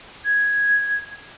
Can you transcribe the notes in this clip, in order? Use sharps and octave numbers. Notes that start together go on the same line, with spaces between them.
G#6